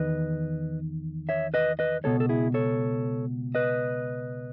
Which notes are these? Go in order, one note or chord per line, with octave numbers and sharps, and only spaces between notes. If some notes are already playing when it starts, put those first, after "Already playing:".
Already playing: E2 D#3 B4 D#5
C#5 E5
B4 D#5
B4 D#5
C#2 B2 A4 C#5
A4
E4 G#4
A4 C#5
B4 D#5